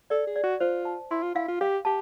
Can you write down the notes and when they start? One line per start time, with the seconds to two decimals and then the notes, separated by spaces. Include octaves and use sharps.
0.10 A4 D5
0.27 G#4
0.36 D5
0.43 F#4
0.60 F4 C5
0.85 A5
1.11 E4 C6
1.22 F4
1.35 E4 F5
1.48 F4
1.61 G4 F5
1.85 G4 A5